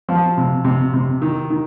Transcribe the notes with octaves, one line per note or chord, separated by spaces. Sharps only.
F3
C3
C3
C3
D#3
D#3